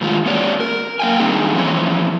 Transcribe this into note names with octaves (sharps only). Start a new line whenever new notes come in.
A2 D#3 G#3 F4
A#3 C#4 F#4 C#5 D5
A#4
A#3 F5 G5 G#5
D3 D#3 G3 C4 D#4 G#4
E3 F3 C4 C#4